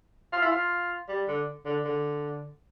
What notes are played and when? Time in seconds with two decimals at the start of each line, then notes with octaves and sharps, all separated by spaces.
0.33 F4
0.42 E4
0.51 F4
1.08 G3
1.28 D3
1.65 D3
1.85 D3